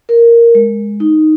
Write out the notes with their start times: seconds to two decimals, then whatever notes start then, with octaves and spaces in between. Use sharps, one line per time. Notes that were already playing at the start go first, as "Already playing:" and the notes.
0.09 A#4
0.55 G#3
1.00 D#4